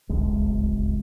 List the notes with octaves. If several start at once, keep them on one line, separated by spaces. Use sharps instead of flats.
D1 G1 C#2 G#3